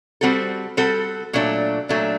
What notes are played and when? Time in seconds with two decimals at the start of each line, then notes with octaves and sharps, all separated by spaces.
0.21 G3 C4 F#4 A4
0.77 G3 C4 F#4 A4
1.33 A#2 F#3 A3 D4
1.89 A#2 F#3 A3 D4